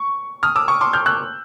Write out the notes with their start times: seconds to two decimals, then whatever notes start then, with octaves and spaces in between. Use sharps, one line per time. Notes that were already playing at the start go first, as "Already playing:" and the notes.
Already playing: C#6
0.43 D#6 F6
0.56 D6 E6
0.68 C#6 D#6
0.81 C6 D6
0.93 F6 G6
1.06 E6 F#6